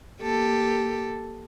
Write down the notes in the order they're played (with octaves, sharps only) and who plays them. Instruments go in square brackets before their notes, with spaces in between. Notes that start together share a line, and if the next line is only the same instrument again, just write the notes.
[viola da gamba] A#3 G4 A4